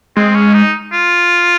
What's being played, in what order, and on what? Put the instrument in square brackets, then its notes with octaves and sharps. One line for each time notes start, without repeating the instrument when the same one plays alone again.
[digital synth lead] G#3 [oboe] C4
[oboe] C#4
D#4
F4